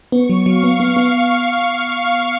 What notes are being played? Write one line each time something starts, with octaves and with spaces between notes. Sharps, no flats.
B3 C#6
F#3
F#3 F5
B3
B3
B3